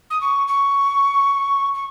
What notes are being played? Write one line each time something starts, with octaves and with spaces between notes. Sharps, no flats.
D#6
C#6
C#6
C#6